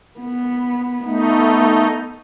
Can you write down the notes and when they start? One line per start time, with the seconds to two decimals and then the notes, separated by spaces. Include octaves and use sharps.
0.20 B3
1.05 A3 B3 D#4